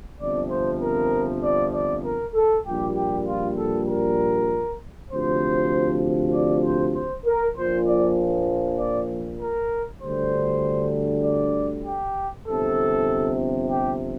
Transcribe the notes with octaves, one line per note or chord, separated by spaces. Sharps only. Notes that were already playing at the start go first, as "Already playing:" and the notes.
G1 F2 C3 F3 D5
C5
A#4
D5
D5
A#4
A4
A#1 A#2 G3 G4
G4
F4
A4
A#4
D2 C3 F3 C5
D5
C5
C5
A#4
A#1 A#2 F3 C5
D5
D5
A#4
D2 D3 G3 C5
D5
G4
G1 F2 C3 A4
G4